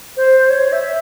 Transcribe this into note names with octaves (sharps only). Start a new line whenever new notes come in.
C5
C#5
E5